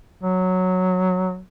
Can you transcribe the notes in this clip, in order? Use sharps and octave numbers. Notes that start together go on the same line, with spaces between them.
F#3